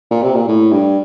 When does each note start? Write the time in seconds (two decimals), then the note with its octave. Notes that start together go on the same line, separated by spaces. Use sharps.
0.11 A#2
0.23 C3
0.35 A#2
0.48 A2
0.72 G2